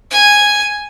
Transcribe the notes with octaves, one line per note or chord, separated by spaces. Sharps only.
G#5